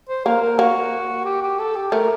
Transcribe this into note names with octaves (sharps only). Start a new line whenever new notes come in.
C5
A#3 A#4
A#4
A#3 F#4
G4
G4
A4
G4
A3 A#4